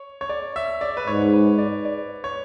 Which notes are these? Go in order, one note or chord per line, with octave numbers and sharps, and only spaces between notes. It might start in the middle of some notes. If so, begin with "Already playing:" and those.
Already playing: C#5
C#5
D5
E5
D5
B4
G#2 C#5
B4
D5
D5
C#5